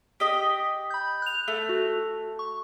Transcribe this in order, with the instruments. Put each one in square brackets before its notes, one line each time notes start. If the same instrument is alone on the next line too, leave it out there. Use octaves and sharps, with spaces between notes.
[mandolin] G4 D#5 [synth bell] B6
[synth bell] B5 G6
F#6 F7
[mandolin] A3
[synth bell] F#4
C#6